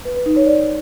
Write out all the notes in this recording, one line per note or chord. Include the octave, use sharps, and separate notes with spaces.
B4
B4
D#4
C#5
D5